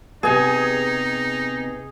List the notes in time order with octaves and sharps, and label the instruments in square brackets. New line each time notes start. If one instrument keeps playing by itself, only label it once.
[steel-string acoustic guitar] C3 B3 [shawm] D#4 [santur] G#4 G#5